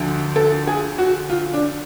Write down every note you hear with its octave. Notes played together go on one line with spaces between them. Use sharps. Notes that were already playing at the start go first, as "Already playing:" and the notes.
Already playing: D2 D3 F3
A4
G#4
F#4
F4
D4